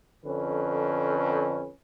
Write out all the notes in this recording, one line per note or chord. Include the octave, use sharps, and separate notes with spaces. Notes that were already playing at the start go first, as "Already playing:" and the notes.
F2 D3 C#4 B4